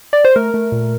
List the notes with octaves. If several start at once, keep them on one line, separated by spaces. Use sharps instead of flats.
D5
C5
A3 A#4
A3
A#2